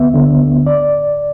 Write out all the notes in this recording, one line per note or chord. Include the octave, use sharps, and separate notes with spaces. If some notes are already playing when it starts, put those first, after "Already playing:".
Already playing: D2 B3 E5
D3
D2
D5